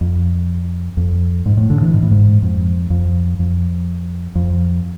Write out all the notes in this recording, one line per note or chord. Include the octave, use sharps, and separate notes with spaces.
F2
F2
G#2
A2
D3
E3
G#2
A2
G#2
F2
F2
F2
F2